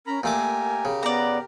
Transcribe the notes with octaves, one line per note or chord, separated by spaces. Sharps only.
C#4 A#4 A#5 B5
A#2 A3 G4 A#4 G#5 D6
C#3
B3 D5 A#5